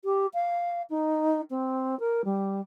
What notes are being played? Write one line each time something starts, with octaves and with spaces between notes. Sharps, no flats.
G4
F5
D#4
C4
A#4
G3